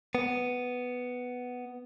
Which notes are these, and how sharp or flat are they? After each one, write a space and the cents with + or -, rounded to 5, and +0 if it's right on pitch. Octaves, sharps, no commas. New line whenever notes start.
B3 +5